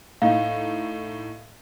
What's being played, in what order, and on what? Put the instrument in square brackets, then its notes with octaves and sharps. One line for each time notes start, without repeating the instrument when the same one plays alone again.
[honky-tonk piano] A2 D#4 [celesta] F5